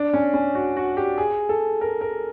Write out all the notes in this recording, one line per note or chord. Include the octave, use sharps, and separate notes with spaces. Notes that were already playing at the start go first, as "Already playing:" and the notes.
Already playing: D4
C#4
C#4
F#4
F#4
G4
G#4
A4
A#4
A#4